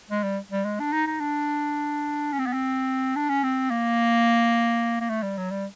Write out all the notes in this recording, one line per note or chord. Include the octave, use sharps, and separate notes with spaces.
G#3
G3
G3
G#3
D4
D#4
D#4
D4
C#4
C4
B3
C4
D4
C#4
C4
A#3
A#3
A3
G3
F#3
G3